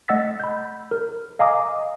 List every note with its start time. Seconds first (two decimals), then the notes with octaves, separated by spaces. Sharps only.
0.08 A3 D#5 F#5 E6 A6 B6
0.40 B5 G6
0.91 A#4
1.39 D#5 F5 G#5 A#5 D6 D#6